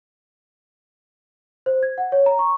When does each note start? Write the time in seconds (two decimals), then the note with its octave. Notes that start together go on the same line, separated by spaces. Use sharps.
1.66 C5
1.83 G#6
1.98 F#5
2.12 C#5
2.26 A#5
2.39 C#6